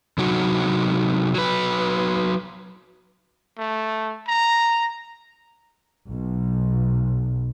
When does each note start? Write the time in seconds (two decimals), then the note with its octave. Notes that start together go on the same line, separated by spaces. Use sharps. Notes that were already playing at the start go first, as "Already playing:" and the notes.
0.18 C3 F#3 D#4 F#4
1.34 F#3 B4
3.58 A3
4.28 A#5
6.08 B1